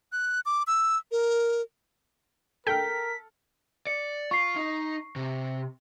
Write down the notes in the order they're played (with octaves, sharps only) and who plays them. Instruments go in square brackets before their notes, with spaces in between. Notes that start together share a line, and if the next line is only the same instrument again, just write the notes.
[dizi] F#6
D6
E6
A#4
[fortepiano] A4 F6 [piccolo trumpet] A#4 [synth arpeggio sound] G5 [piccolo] B6
[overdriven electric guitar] D5 [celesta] C#7
[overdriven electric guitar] F4 [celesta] C#6 C7
[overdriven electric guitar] D#4
C3